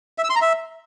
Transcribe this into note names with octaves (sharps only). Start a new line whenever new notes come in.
E5
E6
C6
A#5
E5